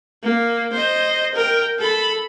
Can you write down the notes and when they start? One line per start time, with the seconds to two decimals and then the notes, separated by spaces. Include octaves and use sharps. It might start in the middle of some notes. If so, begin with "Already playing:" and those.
0.23 A#3
0.73 C5 D#5
1.35 A#4 G5
1.79 A4 B5